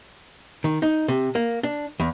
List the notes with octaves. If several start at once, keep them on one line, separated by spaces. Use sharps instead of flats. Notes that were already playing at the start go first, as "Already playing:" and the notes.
D#3
D#4
C3
A#3
D4
E2